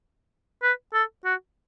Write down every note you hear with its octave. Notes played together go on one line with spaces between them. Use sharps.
B4
A4
F#4